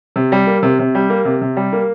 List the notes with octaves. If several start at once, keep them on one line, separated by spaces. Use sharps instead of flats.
C3
G3
A#3
C3
C3
G3
A#3
C3
C3
G3
A#3